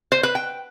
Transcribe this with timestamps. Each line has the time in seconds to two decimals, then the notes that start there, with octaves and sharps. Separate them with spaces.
0.12 C5
0.23 B4
0.35 G5